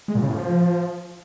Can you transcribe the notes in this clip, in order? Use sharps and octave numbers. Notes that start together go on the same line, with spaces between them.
G#3
A#2
C#3
A2
F3